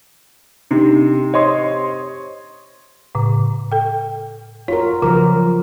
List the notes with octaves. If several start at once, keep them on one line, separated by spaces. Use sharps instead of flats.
C3 D4 D#4
C5 C#5 D#5 C6
A2 C#3
A4 G5
F4 F#4 A#4 C#5
C#3 F3 F#3 A#4